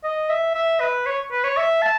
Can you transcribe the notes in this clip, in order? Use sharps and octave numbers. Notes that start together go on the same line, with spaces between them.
D#5
E5
E5
B4
C#5
B4
C#5
E5
A5